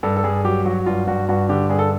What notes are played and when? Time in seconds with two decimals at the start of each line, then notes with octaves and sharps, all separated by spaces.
0.03 G2 A4
0.17 A4
0.24 G2 G#4
0.44 F#3 G4
0.65 F#3 F#4
0.86 G2 F4
1.07 G2 F#4
1.29 G2 F#4
1.49 D3 G4
1.70 G2 G#4
1.79 A4